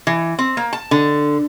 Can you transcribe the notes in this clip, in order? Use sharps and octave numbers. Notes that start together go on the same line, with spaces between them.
E3
C4
A#3
A5
D3